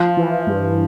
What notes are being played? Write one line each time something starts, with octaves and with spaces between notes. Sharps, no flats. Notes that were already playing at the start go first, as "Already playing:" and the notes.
Already playing: F3 F4
E3
G2